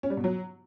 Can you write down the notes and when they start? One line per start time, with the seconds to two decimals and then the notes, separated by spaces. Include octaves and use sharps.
0.03 C#4
0.10 G3
0.17 B2
0.24 F#3